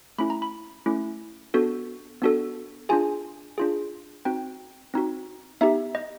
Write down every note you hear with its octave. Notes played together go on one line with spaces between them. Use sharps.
A3 C#4 E4 B5
A#5
B5
A3 C#4 E4
B3 D4 F#4 A4
B3 D4 F#4 A4
D4 F4 G#4 G#5
D4 F4 G#4
C4 D#4 F#4 G5
C4 D#4 F#4
B3 D#4 G4 E5
D#5